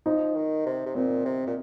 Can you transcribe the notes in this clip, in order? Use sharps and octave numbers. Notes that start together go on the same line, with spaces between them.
F3 D#4
D#3
C3
C3
A#2 C4
C3
A#2